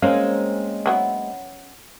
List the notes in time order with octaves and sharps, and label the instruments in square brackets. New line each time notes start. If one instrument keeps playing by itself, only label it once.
[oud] G#3 A#3 C4 [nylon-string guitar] C#4 [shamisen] F5
[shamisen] F#3 B3 E4